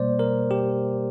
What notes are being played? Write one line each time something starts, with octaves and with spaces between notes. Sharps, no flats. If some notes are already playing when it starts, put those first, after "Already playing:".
Already playing: B2 G3 A#3 C5 D5
A#4
G4